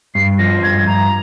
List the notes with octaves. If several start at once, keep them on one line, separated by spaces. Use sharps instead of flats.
G2 C7
F3 A#6
G2 G#6
G2 A#5